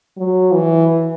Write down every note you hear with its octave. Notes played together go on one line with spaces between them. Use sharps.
F#3
E3